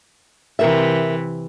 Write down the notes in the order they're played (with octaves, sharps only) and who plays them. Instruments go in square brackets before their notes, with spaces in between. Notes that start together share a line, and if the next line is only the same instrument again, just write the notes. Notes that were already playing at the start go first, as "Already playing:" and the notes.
[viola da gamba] C3 E3 [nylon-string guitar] A#4 E5